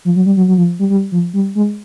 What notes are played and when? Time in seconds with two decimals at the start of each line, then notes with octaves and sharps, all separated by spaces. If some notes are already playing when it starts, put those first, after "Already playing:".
0.05 F3
0.16 F#3
0.26 G3
0.37 F#3
0.48 F#3
0.58 F3
0.79 G3
0.90 G3
1.12 F3
1.33 G3
1.55 G#3